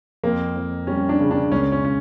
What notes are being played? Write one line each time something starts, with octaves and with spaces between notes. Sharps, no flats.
F2 A#3
F2
G3 C#4
D4
C#3
D4
C#2 C#4
C#4
C#4